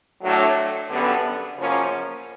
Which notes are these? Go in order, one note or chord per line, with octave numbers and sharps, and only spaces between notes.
A2 F#3 A3 D4
F#2 D3 G3 B3
F#2 C#3 F3 A#3 C#4